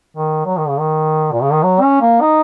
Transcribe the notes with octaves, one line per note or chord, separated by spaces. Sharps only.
D#3
F#3
D#3
C#3
D#3
A#2
C#3
D#3
F#3
C#4
A#3
D#4